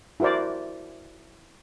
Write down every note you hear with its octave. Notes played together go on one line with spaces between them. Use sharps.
E4 F#4 A#4 C5 D5